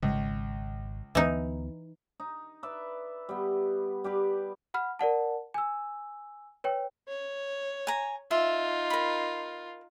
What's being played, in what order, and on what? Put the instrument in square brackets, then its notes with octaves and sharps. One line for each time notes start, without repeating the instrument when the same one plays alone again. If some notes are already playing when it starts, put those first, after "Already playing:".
[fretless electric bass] G#1 [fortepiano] C#2
[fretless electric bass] D2 B3 [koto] E3 D#4
[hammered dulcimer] D#4
B4 D5 E5
G3 B3
G3 G4 B4
[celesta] F#5 B5 F6
A#4 D5 F#5 A5
G#5 E6
B4 C#5 G5
[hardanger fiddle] C#5
[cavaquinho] G#5 A#5
[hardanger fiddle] D#4 F4 [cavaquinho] E5
[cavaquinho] A#4 B5